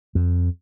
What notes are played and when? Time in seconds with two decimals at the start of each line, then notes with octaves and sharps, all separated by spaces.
0.15 F2